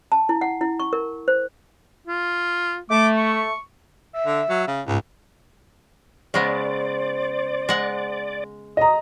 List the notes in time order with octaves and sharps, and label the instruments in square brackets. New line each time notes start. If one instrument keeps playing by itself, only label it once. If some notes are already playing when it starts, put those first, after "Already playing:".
[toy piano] A5
E4
F#5
E4
C#6
A#4
C5
[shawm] F4
[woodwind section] A3 [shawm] D6
[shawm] C#6
[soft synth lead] E5
[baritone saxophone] D3
F#3
C#3
[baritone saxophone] C#2 [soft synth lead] G#2
[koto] C#3 G#3 B3 [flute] C5 [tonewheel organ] D5
[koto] G#3 F#5
[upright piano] D#5 A#5 [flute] D#6